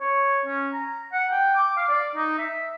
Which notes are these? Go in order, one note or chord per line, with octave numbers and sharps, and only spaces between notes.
C#5
C#4
A#5
F#5
G5
D6
F5
D5
D#4
E5